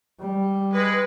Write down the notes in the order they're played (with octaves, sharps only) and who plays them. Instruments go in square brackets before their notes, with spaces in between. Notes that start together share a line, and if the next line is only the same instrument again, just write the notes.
[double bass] G3
[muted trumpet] G#3 [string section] B4